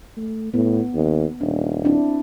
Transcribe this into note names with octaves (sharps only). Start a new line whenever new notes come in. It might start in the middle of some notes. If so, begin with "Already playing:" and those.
A3
A2 B3
D#2
D#1 D4
C4 D4 E4